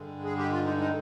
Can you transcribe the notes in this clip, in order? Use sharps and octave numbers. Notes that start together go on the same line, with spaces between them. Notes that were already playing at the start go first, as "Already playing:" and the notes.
Already playing: G2 D3 G#3
G#4
G4
F4
D#4
D#4